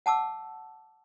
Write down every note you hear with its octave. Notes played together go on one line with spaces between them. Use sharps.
F#5 A5 D6 E6